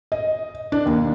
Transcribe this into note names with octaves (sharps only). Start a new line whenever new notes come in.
D#5
D4
D#2